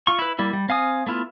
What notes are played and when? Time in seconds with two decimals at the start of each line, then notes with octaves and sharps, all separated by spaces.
0.07 F4 C#6
0.19 E4 B4
0.39 G3 A#3 E4
0.53 G3
0.69 C4 F5 G#5 D#6
1.07 A3 B3 E4 F4